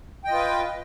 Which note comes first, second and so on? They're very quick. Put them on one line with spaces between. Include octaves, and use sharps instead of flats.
G5 D#5 F4 B4